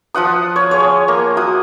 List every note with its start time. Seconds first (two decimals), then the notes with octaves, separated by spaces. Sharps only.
0.14 F3 F4 F#5 D#6
0.56 C#5
0.71 G#4 C#5
1.08 A#3
1.37 F#4 F#5 D#6